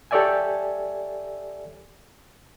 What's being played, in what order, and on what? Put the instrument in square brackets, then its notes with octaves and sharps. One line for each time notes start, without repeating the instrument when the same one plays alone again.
[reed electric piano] G4 A4 C#5 D5 E5 G#5